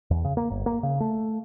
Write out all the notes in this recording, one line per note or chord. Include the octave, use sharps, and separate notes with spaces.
E2
C#3
A#3
G1
A#3
C#3
A3